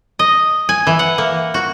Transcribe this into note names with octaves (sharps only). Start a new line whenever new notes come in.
D#5
G#5
E3
F#5
A#3
F#4